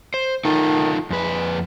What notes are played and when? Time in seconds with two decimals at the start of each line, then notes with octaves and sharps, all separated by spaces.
0.14 C5
0.45 D#3 D#4 F4 A4
1.10 F2 G#3 B4